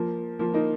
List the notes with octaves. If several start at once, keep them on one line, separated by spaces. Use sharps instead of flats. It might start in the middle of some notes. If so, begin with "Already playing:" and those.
Already playing: F3 A#3
F3 A#3
A#3 D#4